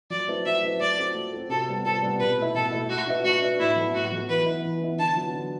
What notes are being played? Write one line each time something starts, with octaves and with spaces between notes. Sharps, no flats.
F#3 D5
A3 C4 E4 B4
F#3 E5
A3 C4 E4 B4
A3 D5
C4 F#4 A4
A3
C4 F#4 A4
C3 A4
G3 B3
C3 A4
G3 B3
B2 B4
A3 E4
B2 A4
A3 E4
A3 F#4
D4 F#4 B4 E5
A3 F#4
D4 F#4 B4 E5
A2 E4
F#3 B3 E4 A4
A2 F#4
F#3 B3 E4 A4
E3 B4
B3 E4
E3
B3 E4
D3 A5
F#3 B3 F#4
D3